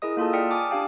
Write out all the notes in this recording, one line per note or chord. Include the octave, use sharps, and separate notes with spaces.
E4 G#4 A#4 D#5 D#6
A#3 F4 A4 A5
D5 G5 D#6 F6 B6 C#7
G#5 A5 D6 D#6 F6
D4 G4 F5 G5